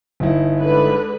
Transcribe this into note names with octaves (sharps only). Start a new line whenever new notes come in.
G1 D#4 E4
D3 G#3 B4